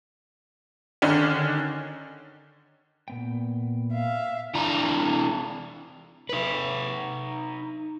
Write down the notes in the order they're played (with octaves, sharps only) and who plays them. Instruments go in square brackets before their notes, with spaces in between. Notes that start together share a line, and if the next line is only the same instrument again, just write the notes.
[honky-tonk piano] D3 D#3 C#4 D4
[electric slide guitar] A#2 B3 G5
[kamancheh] E5 F5
[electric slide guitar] E3 D4 A#5
D#4 B4